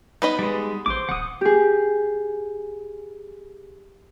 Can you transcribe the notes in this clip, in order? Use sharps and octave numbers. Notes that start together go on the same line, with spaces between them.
B3 D#4 B4 D#5
G3 G#3
A1 C5 D6
D1 F#5 D#6
G4 G#4